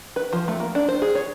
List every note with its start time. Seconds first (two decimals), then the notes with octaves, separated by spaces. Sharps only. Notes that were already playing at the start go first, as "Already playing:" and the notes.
0.16 B4
0.33 F3
0.48 A3
0.60 A#3
0.75 D4
0.89 C5
1.02 G#4
1.15 C#5